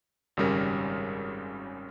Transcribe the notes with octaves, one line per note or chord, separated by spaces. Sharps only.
G#1 F#2 C#3 G3 C#4 A#4